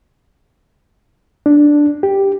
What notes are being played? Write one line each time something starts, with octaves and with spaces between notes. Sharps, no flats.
D4
G4